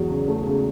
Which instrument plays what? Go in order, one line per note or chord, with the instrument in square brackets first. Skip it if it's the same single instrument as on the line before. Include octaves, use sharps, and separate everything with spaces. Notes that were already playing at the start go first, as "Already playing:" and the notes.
Already playing: [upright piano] E2 G#2 F#3
C#3
A3
C#3